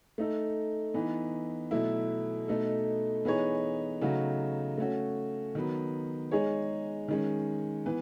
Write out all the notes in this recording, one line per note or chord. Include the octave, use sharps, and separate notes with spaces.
A3 D#4 A4
E3 B3 D#4
B2 F#3 A3 E4
B2 A3 D#4 A4
E3 B3 D#4 G#4 C#5
C#3 F#3 A3 D#4 F#4
A3 C#4 F#4
D#3 F#3 B3
G#3 D#4 G#4 C#5
D#3 G#3 C#4
E3 B3 B4